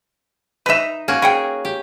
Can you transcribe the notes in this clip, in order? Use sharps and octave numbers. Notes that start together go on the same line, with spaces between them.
D#4 B4 E5 A#5
A#3 C#4 F#4
G#4 A#4 F#5 G5
G4